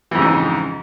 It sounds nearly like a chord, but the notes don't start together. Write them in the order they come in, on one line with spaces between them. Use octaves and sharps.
E3 F2 C#3 G#2